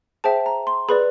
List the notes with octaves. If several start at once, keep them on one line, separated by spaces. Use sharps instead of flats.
G#4 C5 E5 G5 A5
A#5
C6
G#4 B4 D5 B5